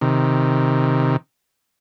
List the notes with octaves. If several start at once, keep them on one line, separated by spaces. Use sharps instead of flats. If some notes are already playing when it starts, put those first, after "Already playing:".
C3 D#3